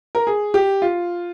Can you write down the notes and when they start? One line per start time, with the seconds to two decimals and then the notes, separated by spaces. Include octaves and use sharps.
0.15 A#4
0.27 G#4
0.54 G4
0.82 F4